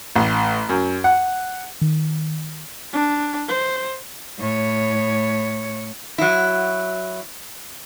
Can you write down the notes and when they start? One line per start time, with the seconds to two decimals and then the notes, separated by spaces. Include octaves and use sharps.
0.15 A1
0.69 F#2
1.04 F#5
1.81 D#3
2.93 D4
3.48 C5
4.38 A2 C#5
6.18 F#3 E4